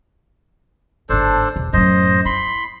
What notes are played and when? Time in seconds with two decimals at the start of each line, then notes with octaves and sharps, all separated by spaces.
1.09 G1 G#2 D4 A4 C5
1.56 E2 B2
1.73 F#2 A2 C5 D#5
2.26 E4 B5 C6